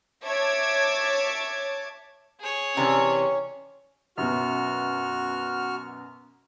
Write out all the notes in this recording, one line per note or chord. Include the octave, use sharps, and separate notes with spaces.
C#5 E5 A5 D6 G#6
G#4 C#5
C3 E3 C#4 D4
F#2 B2 F#4 F6